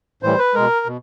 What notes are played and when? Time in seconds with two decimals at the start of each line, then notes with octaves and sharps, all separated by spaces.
0.23 A2 E3 G3 C5
0.38 B4
0.54 B2 G#3 A#4
0.86 B2